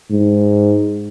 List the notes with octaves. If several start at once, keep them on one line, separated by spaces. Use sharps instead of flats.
G#2